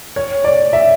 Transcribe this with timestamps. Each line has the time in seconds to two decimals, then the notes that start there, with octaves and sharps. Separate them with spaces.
0.16 C#5
0.44 D5
0.73 E5